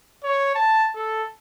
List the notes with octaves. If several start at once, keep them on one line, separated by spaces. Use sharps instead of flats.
C#5
A5
A4